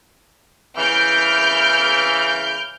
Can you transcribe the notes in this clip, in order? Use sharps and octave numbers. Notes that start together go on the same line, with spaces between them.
C#3 E3 F6 G6 D7